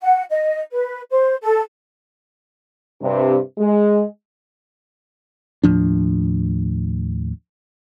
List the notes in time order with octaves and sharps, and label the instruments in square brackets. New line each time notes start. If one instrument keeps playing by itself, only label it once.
[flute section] F#5
D#5
B4
C5
A4
[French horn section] G2 C3
G#3
[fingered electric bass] D#2 A2 F3 D4